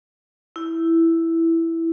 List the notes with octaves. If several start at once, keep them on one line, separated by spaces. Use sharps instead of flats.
E4